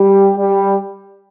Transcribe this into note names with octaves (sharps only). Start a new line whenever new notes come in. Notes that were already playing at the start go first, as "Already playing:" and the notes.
Already playing: G3 G4
G3 G4